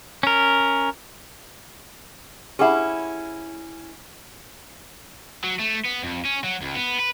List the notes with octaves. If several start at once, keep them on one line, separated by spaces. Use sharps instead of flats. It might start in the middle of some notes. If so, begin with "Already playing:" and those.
C#4 A#4
C#4 E4 G4 G#4 F#5
F#3
A3
B3
F2
C#4
F#3
C#2
B3
B4